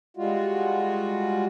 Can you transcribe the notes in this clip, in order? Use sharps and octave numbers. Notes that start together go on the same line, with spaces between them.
G3 G#3 F4 F#4